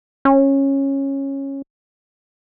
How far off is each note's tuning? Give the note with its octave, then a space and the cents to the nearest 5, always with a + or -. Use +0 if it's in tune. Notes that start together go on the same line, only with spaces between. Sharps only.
C#4 -15